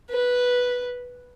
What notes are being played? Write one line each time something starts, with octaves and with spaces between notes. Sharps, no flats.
B4